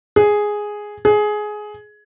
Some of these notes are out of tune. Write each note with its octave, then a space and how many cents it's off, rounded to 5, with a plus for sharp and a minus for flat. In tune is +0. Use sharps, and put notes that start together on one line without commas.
G#4 +0
G#4 +15